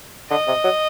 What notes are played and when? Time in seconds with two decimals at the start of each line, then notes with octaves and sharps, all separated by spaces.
0.30 D3 D#5
0.48 C3
0.64 F#3